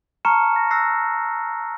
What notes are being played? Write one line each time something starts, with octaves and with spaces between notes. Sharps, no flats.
A5 A#5 C#6 F6 C#7 E7
A#6
E6 F#6 A#6 C7